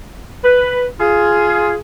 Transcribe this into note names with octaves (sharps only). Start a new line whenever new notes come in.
B4
F4 G#4